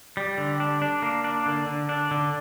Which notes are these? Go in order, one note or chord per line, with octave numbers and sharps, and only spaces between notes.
G3
D3
D4
D4
A#3
D4
D3
D3
D4
D3